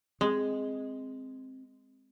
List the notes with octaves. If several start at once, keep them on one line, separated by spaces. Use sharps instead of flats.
G#3 C4